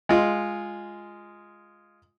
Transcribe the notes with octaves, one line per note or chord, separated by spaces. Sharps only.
G#3 F4